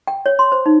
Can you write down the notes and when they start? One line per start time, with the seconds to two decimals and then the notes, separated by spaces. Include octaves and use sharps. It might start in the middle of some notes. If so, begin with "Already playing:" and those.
0.07 G5
0.26 C#5
0.39 C6
0.52 C5
0.66 D#4